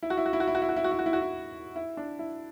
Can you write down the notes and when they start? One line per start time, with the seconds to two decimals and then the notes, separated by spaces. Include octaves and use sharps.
0.03 E4
0.10 F#4
0.17 E4
0.26 F#4
0.33 E4
0.40 F#4
0.47 E4
0.55 F#4
0.62 E4
0.69 F#4
0.76 E4
0.84 F#4
0.91 E4
0.99 F#4
1.06 E4
1.13 F#4
1.21 E4
1.76 E4
1.97 D4
2.19 E4